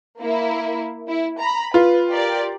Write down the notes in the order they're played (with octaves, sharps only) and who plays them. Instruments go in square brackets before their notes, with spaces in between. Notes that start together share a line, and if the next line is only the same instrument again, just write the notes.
[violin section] A#3 E4
E4
A#5 B5
[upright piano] F4 [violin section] B4
[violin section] G4 A#4 D5